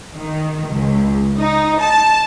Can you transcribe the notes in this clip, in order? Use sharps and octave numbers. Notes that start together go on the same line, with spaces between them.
D#3
C#2
D#4
A5